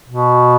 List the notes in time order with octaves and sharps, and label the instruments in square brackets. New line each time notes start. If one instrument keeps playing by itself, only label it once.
[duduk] B2